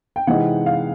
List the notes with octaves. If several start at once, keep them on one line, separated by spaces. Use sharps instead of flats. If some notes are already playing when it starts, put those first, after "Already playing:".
G5
C3 E3 G#3 C4 D#4 F#5
F5